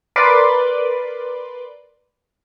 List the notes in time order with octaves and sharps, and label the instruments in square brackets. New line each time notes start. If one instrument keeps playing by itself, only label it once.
[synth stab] A#4 B4 D5 C6 D6